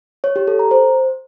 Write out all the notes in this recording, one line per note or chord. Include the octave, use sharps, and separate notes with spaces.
C#5
G4
A4
A#5
C5